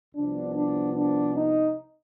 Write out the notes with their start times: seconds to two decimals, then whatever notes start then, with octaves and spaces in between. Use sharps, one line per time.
0.15 C2 C3 F3 B3 D4
0.55 D4
0.95 D4
1.34 D#4